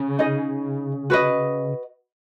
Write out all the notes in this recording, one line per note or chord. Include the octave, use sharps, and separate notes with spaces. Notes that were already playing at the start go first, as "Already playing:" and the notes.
Already playing: C#3
D#4 G#4 D#5
F#4 B4 D#5